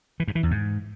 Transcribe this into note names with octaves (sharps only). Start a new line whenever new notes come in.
E3
G2
E3
E2
G#2